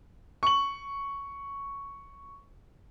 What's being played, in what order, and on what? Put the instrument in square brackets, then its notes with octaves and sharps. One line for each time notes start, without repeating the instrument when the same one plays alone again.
[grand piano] C#6 F#7